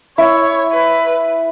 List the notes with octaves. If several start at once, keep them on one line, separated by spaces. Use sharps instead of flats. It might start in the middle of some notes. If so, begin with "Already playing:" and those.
E4 C#5
B4